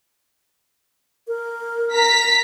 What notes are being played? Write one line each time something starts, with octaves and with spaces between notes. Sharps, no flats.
A#4
A#5 B6